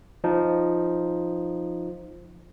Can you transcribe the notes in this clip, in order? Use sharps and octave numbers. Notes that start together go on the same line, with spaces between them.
F3 D#4